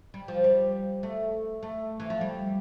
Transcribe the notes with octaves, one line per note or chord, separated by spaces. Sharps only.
G3
F3
G3
A3
A3
E3
F3
G3